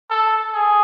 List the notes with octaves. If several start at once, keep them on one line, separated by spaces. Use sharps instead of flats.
A4
G#4